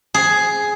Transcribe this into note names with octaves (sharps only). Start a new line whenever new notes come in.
G#4